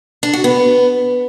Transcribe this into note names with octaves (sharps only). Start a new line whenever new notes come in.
D4
F#4
B3